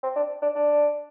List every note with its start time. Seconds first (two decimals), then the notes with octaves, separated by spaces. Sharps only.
0.03 C4
0.16 D4
0.42 D4
0.56 D4